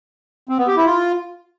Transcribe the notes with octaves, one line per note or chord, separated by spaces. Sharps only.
C4
B3
G4
E4
F4